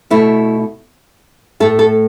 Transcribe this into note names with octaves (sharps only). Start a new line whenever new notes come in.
B2 A3 E4
A2 A3 A4
A4